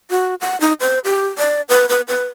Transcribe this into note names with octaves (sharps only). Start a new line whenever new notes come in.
F#4
F#5
D#4
C5
G4
D5
B4
B4
B4